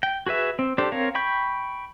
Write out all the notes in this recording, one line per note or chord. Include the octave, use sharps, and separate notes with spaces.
G5
F#4 G#4 B4 E5
C4
D4 G4 A4 C5
C4 A#4 C#5 F5
G5 B5 C#6 G6